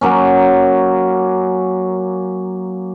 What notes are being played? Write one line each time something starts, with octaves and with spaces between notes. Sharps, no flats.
F#3 A#3 C#4